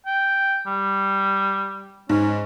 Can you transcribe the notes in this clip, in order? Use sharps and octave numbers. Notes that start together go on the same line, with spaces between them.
G5
G3
G#2 C#4